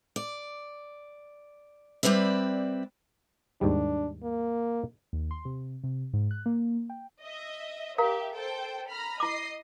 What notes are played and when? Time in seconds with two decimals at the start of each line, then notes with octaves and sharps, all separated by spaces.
0.16 D5
2.03 G3 C4 B4 D5 E5
3.61 D#2 G#2 G3 D4
4.23 A#3
5.13 D#2
5.31 C6
5.45 C3
5.84 C3
6.13 G#2
6.31 F#6
6.46 A#3
6.90 G5
7.22 D#5 E5
7.98 G4 A#4 E5 F5 A#5
8.34 A4 C5 G5
8.90 A#5 B5 F6
9.20 E4 D#5 D6 C7